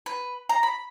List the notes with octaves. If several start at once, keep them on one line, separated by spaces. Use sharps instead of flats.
B4
A#5
B5